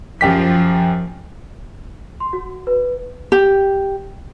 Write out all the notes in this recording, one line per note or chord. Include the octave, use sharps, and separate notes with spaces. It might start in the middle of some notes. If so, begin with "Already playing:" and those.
F#2 F3 G4 B6
C6
F#4
B4
G4